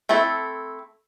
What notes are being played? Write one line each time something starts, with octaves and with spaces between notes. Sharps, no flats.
A3 C4 E4 A4